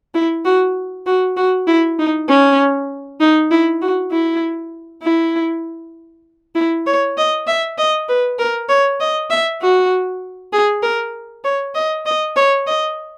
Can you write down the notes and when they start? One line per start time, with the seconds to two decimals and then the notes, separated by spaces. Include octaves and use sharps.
0.14 E4
0.45 F#4
1.06 F#4
1.37 F#4
1.67 E4
1.98 D#4
2.29 C#4
3.20 D#4
3.51 E4
3.81 F#4
4.11 E4
5.03 E4
6.55 E4
6.87 C#5
7.17 D#5
7.47 E5
7.78 D#5
8.09 B4
8.39 A#4
8.69 C#5
9.00 D#5
9.30 E5
9.62 F#4
10.52 G#4
10.83 A#4
11.44 C#5
11.75 D#5
12.06 D#5
12.36 C#5
12.67 D#5